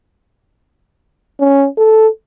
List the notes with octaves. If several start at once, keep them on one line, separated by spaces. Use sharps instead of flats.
C#4
A4